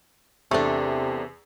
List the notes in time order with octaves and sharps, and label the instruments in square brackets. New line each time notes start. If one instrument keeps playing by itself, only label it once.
[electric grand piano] E2 [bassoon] C3 [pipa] A3 D4 [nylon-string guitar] C4 A4